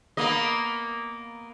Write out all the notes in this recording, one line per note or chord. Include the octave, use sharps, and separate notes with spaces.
A#3 B3 D#5